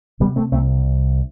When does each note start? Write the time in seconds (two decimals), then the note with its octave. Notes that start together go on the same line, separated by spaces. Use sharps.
0.20 C3 G3 B3
0.36 A3 C4
0.52 C2 A3 C4